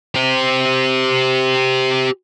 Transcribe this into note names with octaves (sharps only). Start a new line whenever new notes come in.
G4 C5